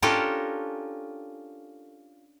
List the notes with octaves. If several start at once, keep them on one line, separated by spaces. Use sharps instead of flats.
C#4 D4 F4 G4 A4 A#4